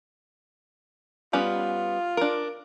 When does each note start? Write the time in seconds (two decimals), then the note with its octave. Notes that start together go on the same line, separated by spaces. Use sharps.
1.33 G3 B3 C#4 F4
2.17 D4 A#4